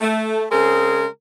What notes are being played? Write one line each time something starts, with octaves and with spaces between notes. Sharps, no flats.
A3
C#3 G#3 C4 G#4 A#4